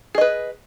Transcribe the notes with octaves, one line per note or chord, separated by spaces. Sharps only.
G#4 B4 D#5